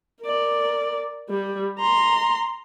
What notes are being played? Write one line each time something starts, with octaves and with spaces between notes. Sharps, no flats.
A#4 D5
G3
A#5 C6